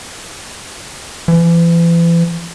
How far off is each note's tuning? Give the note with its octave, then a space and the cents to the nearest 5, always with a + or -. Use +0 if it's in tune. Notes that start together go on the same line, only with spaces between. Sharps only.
E3 +40